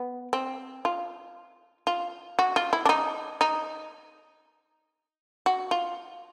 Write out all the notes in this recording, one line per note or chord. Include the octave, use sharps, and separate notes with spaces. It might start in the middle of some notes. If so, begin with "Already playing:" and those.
Already playing: B3
C4
F4
F4
F#4
F4
E4
D4
D#4
D#4
F#4
F4